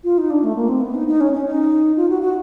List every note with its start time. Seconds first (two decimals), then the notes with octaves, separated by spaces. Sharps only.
0.04 F4
0.18 D#4
0.30 D4
0.44 A3
0.56 A#3
0.68 C4
0.81 B3
0.94 D#4
1.08 D#4
1.21 C#4
1.33 C#4
1.46 D#4
1.97 F4
2.10 F#4
2.22 F#4